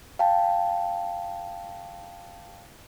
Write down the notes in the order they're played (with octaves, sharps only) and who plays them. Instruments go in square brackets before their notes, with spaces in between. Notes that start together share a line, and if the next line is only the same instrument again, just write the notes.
[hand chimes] F5 G5 A5